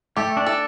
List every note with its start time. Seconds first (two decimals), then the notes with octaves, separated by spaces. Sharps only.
0.17 A3 G4
0.37 D4
0.47 A4